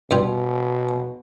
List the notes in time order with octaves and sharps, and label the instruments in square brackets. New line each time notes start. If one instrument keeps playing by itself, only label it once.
[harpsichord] G2 G3 F4 [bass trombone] B2